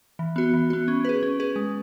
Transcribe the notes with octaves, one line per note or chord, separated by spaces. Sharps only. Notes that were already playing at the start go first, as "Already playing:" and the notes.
E3
B3 F#4
E3
B3 F#4
C#4
G#4 B4
C#4
G#4 B4
G#3